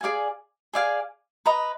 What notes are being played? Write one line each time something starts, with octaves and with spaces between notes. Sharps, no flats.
G#4 D5 F5 G#5
G#4 D5 F5 G#5
B4 D#5 A#5 D#6